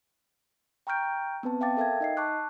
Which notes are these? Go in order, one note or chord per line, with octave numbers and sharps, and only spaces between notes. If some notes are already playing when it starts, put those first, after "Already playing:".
G5 A#5 C#6 F6 G6 D7
B3 C4 B4 A5
E5 F5 G5 A5 D6 A6
A4 A#4 E5 F5 G5 G#6
D#4 D#5 C7
A5 C#6 D6 F#6